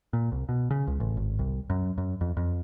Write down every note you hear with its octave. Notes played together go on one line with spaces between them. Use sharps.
A#2
C2
B2
C#3
C#2
A1
G#1
C2
F#2
F#2
F2
F2